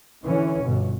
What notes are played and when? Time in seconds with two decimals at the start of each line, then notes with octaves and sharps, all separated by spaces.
0.23 D3 E3 C#4
0.63 G1 B2